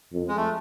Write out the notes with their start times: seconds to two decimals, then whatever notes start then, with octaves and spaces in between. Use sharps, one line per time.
0.13 F2
0.28 G#3
0.37 A3